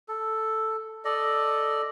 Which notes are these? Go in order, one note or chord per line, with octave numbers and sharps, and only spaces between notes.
A4
A4 D5 D#5